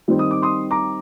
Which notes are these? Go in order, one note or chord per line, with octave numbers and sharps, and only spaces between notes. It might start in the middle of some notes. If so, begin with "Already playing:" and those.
D#3 G3 C4 D#4
D#6
D6
C6 D#6
A#5 D6